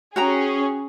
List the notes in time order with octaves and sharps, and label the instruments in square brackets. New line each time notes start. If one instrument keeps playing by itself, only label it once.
[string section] C#4 G#4 [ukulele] F#4 G5 A#5